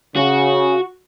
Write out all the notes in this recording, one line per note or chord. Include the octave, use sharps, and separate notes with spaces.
C#3 F#4